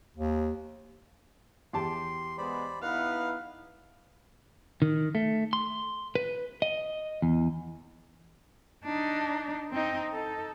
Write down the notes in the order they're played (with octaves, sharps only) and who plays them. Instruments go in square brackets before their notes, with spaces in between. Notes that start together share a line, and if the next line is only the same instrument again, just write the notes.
[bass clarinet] D#2
[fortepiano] E2 G4 A5 [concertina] C6
[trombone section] G#3 B3 [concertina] C5 D5 B5
[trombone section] B3 D#4 E4 [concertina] B4 F#5 [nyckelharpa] F5
[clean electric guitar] D#3
A3
C6
B4
D#5
E2
[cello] D4 D#4
C4 D#4
D#4 A4